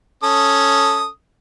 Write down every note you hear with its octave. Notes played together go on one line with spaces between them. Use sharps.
C#4 A4 D#6